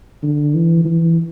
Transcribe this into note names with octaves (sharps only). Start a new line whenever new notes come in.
D3
E3
E3